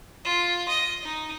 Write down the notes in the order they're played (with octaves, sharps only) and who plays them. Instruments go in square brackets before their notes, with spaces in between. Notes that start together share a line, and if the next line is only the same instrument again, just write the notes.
[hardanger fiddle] F4
D#5
D#4